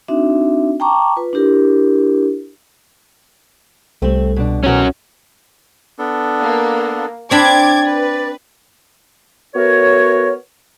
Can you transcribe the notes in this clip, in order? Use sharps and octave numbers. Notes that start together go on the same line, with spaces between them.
C4 D4 D#4 F#4 E5
G5 A5 A#5 C#6 D6
F4 B4
D4 E4 G4 A#4
C2 G3 A3 C4
B2 D4
F2 B2 E3 C#4 F#4
B3 D4 A4
A#3
C4 D4 D5 B5 D6 G#6
B4
A3 B3 F#4 A#4 C#5